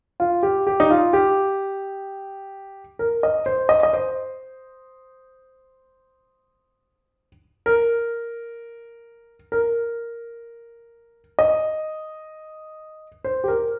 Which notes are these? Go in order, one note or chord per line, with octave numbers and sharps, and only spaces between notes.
F4
G4
G4
D#4
F4
G4
A#4
D#5
C5
D#5
D#5
C5
A#4
A#4
D#5
C5
G4
A#4